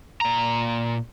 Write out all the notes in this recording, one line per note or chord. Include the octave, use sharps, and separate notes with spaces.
A#2 A#5